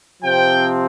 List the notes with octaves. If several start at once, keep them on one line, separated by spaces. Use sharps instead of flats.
C3 F3 C4 G5